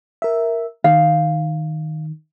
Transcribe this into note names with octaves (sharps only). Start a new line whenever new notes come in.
A#4 E5
D#3 F5